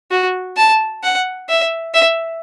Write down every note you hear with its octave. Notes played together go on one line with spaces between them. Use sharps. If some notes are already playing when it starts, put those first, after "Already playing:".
F#4
A5
F#5
E5
E5